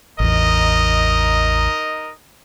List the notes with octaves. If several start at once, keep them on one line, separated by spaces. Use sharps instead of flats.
A1 E2 D#4 A#4 D#5